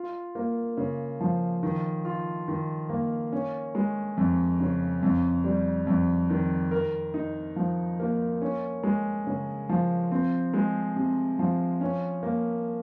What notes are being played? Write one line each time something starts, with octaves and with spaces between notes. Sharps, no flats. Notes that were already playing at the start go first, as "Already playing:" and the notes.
Already playing: F4
A#3
C#3
F3
D#3
F4
D#3
A#3
C#4
G#3
F2
C#3
F2
G3
F2
D#3
A#4
D#4
F3
A#3
C#4
G#3
C#3
F3
C4
G#3
C3
F3
C#4
A#3